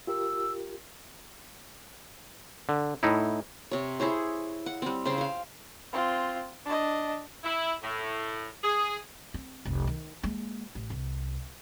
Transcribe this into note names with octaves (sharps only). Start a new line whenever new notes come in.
F4 G4 A#4 E6
D3
A2 D#4 E4
C3 C#5
E4 G#4 C5 C#5
F#5
G3 C4
C#3 C5 G5 C6
C5 F5
C4 F4
D4 D#5
E4
A2
G#4
C4
F1 C2
D#3
G#3 A#3
A1
C2